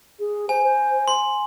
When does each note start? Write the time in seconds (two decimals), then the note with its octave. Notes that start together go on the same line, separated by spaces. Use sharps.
0.19 G#4
0.49 C5 G#5
0.64 C5
1.08 C6